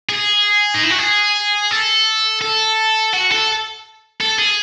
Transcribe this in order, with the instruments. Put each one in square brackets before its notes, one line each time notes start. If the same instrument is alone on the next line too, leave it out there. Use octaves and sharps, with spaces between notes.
[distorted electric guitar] G#4
D#4
E4
F#4
G#4
A4
A4
F#4
A4
A4
G#4